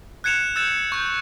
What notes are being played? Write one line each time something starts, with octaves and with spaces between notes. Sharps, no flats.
F#6 G#6 C#7 E7 F7
E6 F#6 G6 A6 E7
C#6 G6